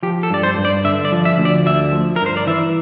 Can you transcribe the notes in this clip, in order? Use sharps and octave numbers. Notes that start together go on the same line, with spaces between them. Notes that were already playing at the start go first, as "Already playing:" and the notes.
F3 G4
A4
G2 D5
C5
G2
D5
D3 E5
D5
F3
E5
D2
D5
D3 E5
F3
A#4
G2
C5
D5
E3 E5